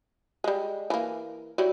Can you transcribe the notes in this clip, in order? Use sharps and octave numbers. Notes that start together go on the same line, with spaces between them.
G3 G#3
E3 A#3
F#3 G3 E4